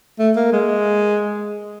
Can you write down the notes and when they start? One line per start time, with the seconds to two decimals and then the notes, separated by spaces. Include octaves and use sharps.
0.19 A3
0.36 A#3
0.53 G#3